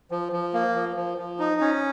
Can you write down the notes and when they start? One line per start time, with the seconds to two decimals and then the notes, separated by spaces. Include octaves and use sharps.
0.11 F3
0.32 F3
0.54 A#3
0.75 F3
0.96 F3
1.18 F3
1.39 D#4
1.61 C#4